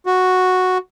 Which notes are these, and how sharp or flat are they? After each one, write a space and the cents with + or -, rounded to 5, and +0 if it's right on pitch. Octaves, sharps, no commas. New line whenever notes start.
F#4 -5